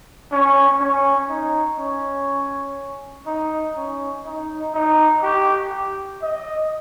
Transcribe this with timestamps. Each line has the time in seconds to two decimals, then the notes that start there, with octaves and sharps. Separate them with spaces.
0.32 C#4
0.80 C#4
1.29 D#4
1.79 C#4
3.26 D#4
3.76 C#4
4.25 D#4
4.73 D#4
5.23 G4
6.21 D#5